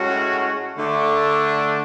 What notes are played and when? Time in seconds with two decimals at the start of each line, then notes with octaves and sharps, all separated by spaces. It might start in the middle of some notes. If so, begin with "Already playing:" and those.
Already playing: A2 G#3 C#4 F#4
0.79 D3 A3 D4